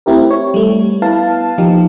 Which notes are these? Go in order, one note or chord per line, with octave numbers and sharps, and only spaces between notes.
A3 C4 E4 G4 A#4
C#5
G3 A3
B3 E4 B4 F5 A5
F3 A#3 D#4 G4